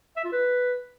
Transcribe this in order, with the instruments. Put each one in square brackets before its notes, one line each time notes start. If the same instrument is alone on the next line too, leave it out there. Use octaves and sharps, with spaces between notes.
[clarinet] E5
F4
B4